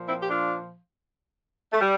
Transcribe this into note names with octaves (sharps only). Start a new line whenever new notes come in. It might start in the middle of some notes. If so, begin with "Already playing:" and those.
Already playing: A#2 F3
C4 E4
G4
D4 F4
A3
G3